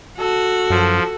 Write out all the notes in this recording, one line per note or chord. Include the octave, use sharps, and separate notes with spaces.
F#4 A4
F#2 F3